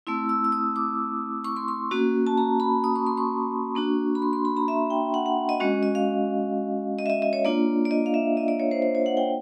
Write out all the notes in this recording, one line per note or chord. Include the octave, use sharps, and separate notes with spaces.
A3 C4 E4 E6
E6
E6
D#6
D6
C#6
C6
C6
A#3 C#4 F#4
A5
A#5
B5
D#6
C#6
C6
C#6
A#3 D4 F#4
B5
C6
C6
B5
A#5
E5
G5
F#5
F#5
D#5
G#3 C#4 F#4 D#5
D#5
F5
D#5
E5
D#5
D#5
C#5
A#3 D4 F4 D5
D5
D#5
F5
E5
D#5
D5
C#5
C5
C5
C#5
F#5
G5